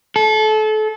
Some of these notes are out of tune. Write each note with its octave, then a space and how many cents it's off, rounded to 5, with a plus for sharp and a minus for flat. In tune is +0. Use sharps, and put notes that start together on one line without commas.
A4 -30